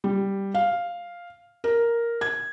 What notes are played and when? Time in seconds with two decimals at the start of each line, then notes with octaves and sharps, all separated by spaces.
0.04 G3
0.54 F5
1.64 A#4
2.21 G#6